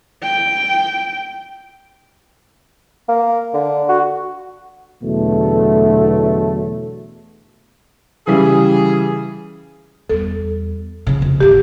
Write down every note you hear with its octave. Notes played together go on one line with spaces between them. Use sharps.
G5
A#3
D3
F#4
E2 B2 D3 F#3 A3
C#3 E3 G3 G#4
E2 G3 A4
C#3 F3
F2
G#1 D3 G4